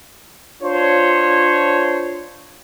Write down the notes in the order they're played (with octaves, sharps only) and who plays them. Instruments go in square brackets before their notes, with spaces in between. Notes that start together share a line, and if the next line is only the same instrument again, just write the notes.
[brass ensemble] D4 F4 C5 C#5